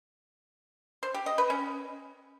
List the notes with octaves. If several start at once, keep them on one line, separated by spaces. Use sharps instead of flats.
C5
G4
D#5
B4
C#4